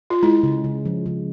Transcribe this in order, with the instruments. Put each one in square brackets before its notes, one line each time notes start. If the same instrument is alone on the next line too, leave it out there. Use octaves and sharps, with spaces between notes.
[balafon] F4
[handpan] G#3 [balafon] E4
[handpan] C#3
C#3
F3
C#3